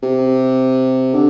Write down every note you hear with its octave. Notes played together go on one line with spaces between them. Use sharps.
C3
D3